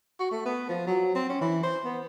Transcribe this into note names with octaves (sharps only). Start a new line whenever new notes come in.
F#4
A3
B3
F3
F#3
C4
C#4
E3
C5
B3